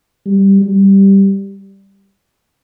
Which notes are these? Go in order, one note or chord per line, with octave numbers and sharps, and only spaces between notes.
G3
G3